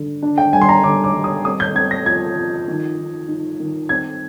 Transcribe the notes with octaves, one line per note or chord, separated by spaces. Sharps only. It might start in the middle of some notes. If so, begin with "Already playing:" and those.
Already playing: D3
D4
G5
G3 G#5
C6
A#5
D3 D6
D6
G3
D#6
C4 D#6
G6
C4 G#6
A#6
F3 G#6
F3
D#3
D#3
D#4
D#3
C4 G#6